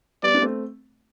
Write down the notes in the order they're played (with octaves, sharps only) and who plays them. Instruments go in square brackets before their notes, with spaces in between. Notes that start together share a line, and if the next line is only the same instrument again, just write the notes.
[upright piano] G3 B3 [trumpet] D5
[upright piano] D4
A3 C4